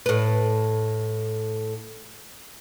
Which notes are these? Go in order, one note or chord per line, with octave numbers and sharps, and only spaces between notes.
A2 B4